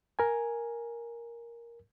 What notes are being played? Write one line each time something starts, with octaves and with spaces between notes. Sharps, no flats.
A#4 G#5